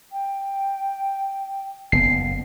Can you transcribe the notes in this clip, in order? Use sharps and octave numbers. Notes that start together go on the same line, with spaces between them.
G5
F#1 B3 C7